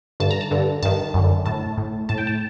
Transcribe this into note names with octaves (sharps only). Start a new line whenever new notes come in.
G2 D3 A5
A#5
A5
G2 D3
G2 D#3 A5
F#2 D3
A2 A5
A2
A2 A5
G5
A5